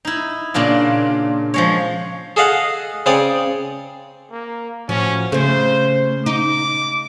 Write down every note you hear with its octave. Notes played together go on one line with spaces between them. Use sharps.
D#4 E4
A#2 C#3 D4 F4
F3 G#3 C#5
G#4 A4 D#5 F5 F#5
C#3 C4 C#5 D5 D#6
A#3
A2 F3 F#3 C#4
C#3 A3 C4 C5
D#4 D6